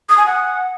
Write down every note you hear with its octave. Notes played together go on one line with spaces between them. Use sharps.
D#6
G#5
F#5